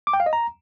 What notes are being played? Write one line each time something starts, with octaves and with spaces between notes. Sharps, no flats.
D6
G5
F5
D#5
A#5